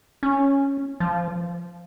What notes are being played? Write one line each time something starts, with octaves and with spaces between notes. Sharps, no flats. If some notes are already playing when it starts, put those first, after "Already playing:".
C#4
F3